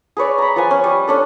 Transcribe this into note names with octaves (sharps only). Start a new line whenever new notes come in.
G#4 B4 C#5 D5
A#5 B5
F3 B4 G#5
C#4
G3
C#4 D4 A4